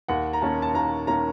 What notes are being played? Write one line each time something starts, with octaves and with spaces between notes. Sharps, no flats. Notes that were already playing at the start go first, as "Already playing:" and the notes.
D#2 F#5
A#5
D#3 A#3 C#4 A5
A5
D#2 A#5
D#3 A#3 C#4 A#5